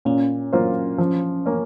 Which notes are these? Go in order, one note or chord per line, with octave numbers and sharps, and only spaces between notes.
A#2 C#4
F#3 A#3 F4 C5
F3
A#3 C#4